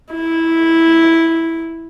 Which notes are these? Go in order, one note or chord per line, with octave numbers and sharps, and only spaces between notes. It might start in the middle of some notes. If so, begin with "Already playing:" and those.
E4